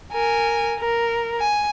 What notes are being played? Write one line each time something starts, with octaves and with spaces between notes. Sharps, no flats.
A#4 G#5
A#4
G#5